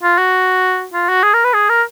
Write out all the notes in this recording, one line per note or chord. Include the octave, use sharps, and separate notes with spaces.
F4
F#4
F4
F#4
G#4
A#4
B4
G#4
A#4